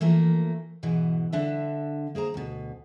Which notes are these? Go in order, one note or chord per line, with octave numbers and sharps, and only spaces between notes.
E3 F3 A3 A#3 A#4
G#2 B2 E3
D3 D4 E5
A#3 G#4 C5 A#5
D2 B2